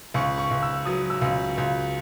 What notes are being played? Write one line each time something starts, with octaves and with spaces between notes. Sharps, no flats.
C#2 C#6
C#6
C#2
E6
F#3 D#6
E6
C#2
C#2